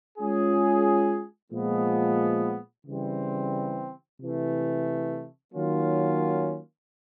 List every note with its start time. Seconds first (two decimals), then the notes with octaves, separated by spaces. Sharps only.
0.17 G#3 C#4 F4 G#4
1.51 A#2 F3 G#3 B3
2.85 C#3 E3 G3 C4
4.18 C3 E3 A3
5.53 D#3 F#3 A#3 C#4 F4